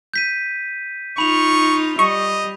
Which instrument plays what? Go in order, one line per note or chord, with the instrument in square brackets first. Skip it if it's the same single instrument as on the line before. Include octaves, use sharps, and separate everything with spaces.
[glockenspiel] G6 B6 D#7
[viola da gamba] D#4 F4 [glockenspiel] B5 F7 [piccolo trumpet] C#6
[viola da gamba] G3 [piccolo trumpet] D#5 [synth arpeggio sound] C#6